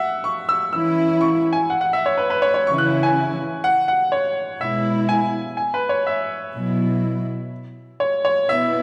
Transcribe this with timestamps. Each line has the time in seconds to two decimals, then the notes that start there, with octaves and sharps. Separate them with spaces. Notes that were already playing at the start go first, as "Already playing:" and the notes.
Already playing: E5 F#5
0.24 C#6
0.49 E6
0.72 E3 C#4 E4 E6
1.21 C#6
1.53 G#5
1.70 F#5
1.81 F#5
1.93 E5
2.06 C#5
2.18 B4
2.30 B4
2.42 C#5
2.54 C#5
2.66 C#3 E3 C#4 E4 C#6
2.78 F#6
3.03 G#5
3.64 F#5
3.88 F#5
4.12 C#5
4.60 B2 G#3 E4 E5
5.09 G#5
5.57 G#5
5.74 B4
5.89 C#5
6.07 E5
6.54 B2 F#3 E4
8.00 C#5
8.25 C#5
8.49 B2 B3 E4 E5